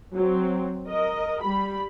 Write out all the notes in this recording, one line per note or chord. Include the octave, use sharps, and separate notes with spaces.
F#3 C4
A#4 D#5
G3 B5